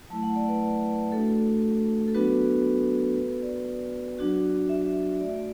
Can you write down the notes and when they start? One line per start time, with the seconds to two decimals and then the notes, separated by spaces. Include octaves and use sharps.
0.10 F#3 A3 E4 A5
0.23 F#5
0.36 D5
0.48 B4
0.62 D5
0.78 E5
0.95 B4
1.12 A3 D4 F#4 A4
2.08 A4
2.14 F#3 B3 D4 F#4 B4
3.16 B3 F#4 B4
3.42 D5
4.19 F#3 D4 F#4
4.69 E5
5.20 A3 F#4 D5